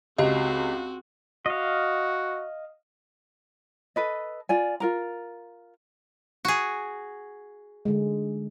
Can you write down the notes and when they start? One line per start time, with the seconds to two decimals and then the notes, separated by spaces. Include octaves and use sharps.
0.18 C#2 C4 F#4 G4 D#5
1.46 F#4 D#5 F5
3.96 A4 B4 D#5
4.49 F4 D5 G#5
4.80 F4 A#4 A#5
6.45 F#4 G#4
7.85 D3 G#3